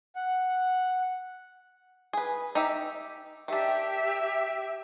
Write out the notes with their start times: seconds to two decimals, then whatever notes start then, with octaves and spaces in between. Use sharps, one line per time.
0.15 F#5
2.13 G#4 B4
2.55 D#4 G4 E5
3.48 D#3 D4 G4 E5